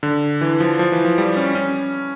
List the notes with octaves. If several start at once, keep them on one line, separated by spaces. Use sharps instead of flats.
D3
E3
F3
F3
E3
F3
G3
C#4
C#4